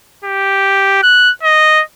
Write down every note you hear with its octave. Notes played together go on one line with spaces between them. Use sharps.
G4
F#6
D#5